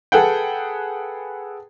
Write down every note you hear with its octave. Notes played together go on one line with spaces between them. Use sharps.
G#4 A4 B4 F#5 G5